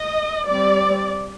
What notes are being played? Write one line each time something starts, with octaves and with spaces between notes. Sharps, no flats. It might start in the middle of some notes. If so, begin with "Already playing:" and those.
Already playing: D#5
G3 C4 D5